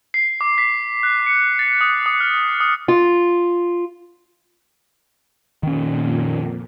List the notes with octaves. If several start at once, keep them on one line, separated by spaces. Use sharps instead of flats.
C7
D6
B6
F#6
C#7
A6
D#6
D#6
F6
D#6
F4
F2 A#2 D#3 C#4